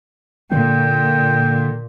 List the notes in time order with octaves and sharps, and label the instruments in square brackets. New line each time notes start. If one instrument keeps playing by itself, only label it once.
[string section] A#2 [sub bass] D3 [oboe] G5